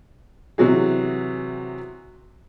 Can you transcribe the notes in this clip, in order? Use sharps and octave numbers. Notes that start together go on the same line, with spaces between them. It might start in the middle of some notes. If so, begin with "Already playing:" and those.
C3 E3 F#3 F#4 G#4